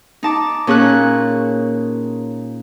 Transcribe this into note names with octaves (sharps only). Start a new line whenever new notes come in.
D#4 A5 D6
A#2 C#4 G#4 C#5 A5 F#6